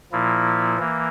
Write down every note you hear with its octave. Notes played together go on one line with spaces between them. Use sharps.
A#2 F3 A#3 E4
E3 A#3